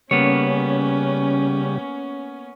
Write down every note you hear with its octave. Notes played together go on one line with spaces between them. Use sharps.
C#3 G3 A#3 B3 C#4 C#5